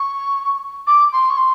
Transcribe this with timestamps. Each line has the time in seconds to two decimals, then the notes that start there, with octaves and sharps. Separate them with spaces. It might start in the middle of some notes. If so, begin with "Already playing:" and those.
Already playing: C#6
0.87 D6
1.12 C6
1.30 C#6
1.37 C6